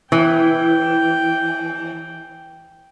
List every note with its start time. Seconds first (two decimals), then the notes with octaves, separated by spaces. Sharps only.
0.12 E3 G5